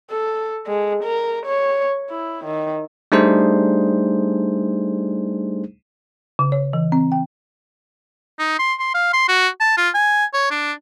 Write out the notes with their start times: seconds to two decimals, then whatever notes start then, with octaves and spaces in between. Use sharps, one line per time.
0.10 A4
0.67 G#3
1.04 A#4
1.46 C#5
2.10 E4
2.45 D#3
3.12 G3 A3 D4 D#4 G#4 C5
6.39 C#3
6.52 C#5
6.73 E3
6.92 C4
7.12 G5
8.39 D#4
8.59 C6
8.79 C6
8.94 F5
9.13 C6
9.28 F#4
9.60 A5
9.77 F4
9.95 G#5
10.34 C#5
10.51 D4